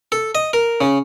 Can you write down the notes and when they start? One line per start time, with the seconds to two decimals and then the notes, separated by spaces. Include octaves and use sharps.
0.12 A4
0.35 D#5
0.53 A#4
0.81 C#3